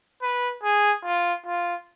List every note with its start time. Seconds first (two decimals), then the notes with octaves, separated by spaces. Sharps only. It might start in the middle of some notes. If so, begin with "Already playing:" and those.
0.22 B4
0.63 G#4
1.05 F4
1.46 F4